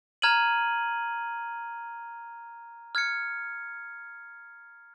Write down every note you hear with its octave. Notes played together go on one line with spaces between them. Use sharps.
A#5 F6 G#6 D#7 F#7
F6 G#6 C#7